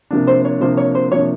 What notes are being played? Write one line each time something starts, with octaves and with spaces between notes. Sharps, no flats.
C3 F3 A#3 D4
C5
C#5
C3 F3 A#3 D4 C5
C#5
C5
C3 F3 A#3 D4 C#5